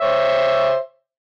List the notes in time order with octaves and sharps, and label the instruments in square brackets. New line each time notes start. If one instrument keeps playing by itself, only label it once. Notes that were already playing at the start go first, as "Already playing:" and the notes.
[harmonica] C5 C#5 E5